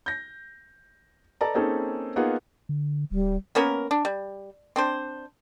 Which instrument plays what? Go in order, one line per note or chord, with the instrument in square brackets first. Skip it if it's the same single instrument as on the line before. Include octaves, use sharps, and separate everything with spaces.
[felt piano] G6 A#6
A4 B4 D5 D#5 A5 A#5
A#3 C4 C#4 D#4 G#4 A4
A#3 B3 D#4 F4 G#4 F#5
[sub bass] D3
[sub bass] D1 [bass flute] G3
[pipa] A#3 B3 C#4 A#4
D4
G3
C4 D4 C5